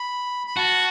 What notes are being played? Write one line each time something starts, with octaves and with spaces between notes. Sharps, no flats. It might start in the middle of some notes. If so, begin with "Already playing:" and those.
Already playing: B5
B5
F#4 A5